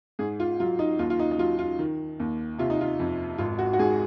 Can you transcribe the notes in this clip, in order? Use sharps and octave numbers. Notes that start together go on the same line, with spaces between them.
G#2 G#4
F4
F#3 F4
D#4
D#2 F4
F4
D#4
D#4
F#3 F4
F4
D#3
D#2
C3 F4
D#4
F4
F2
G#1 F4
F#4
F#4
G#2 G#4